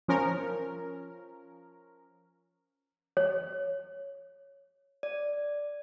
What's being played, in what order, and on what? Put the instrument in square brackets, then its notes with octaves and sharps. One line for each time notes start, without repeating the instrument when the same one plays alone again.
[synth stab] F3 C#4 A#4
[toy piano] C#5
[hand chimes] D5